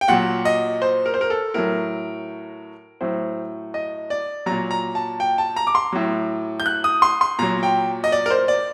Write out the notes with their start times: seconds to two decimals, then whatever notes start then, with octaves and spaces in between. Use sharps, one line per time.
0.01 G5
0.08 A#2 F#3 F#5
0.45 D#5
0.82 C5
1.06 A#4
1.14 C5
1.21 A#4
1.30 A4
1.54 A2 F#3 A#4
3.01 A2 F#3 C5
3.74 D#5
4.10 D5
4.46 A#2 F#3 A#5
4.71 A#5
4.95 A5
5.20 G5
5.38 A5
5.56 A#5
5.67 D6
5.75 C6
5.92 A2 F#3
6.60 G6
6.66 F#6
6.84 D#6
7.02 C6
7.21 C6
7.39 A#2 F#3 A#5
7.63 G5
8.04 D#5
8.12 D5
8.26 A#4
8.30 C5
8.48 D5